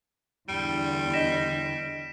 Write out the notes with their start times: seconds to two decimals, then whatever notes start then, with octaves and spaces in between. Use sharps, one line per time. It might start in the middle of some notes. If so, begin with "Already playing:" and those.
0.48 E2 D3 G3 D7
1.13 D#5 A#6 B6 E7